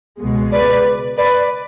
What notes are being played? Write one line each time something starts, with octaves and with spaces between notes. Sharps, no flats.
C#2 B2 G#3
B4 D5
B4 D5